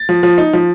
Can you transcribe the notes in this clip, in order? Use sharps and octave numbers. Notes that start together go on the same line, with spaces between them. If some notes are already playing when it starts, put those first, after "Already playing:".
Already playing: A6
F3
F3
D#4
F3